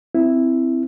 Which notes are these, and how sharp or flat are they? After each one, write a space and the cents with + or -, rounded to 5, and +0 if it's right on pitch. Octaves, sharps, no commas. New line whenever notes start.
C4 -10 E4 +0